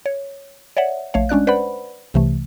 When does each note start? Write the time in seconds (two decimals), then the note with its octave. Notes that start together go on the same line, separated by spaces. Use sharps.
0.06 C#5
0.77 C#5 D5 E5 F#5
1.14 A#1 A3 C#5 F5
1.29 G#3 C#4 D4 D5 F#6
1.47 B4 C5 D5 F#5 B5
2.14 C2 C3 E3 A3